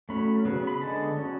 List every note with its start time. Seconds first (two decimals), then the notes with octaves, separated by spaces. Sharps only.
0.09 F#3 A3 C#4 B5
0.45 C#3 F#3 B3
0.67 B5
0.81 D3 G#3 B3 A5
1.16 F#3 C#4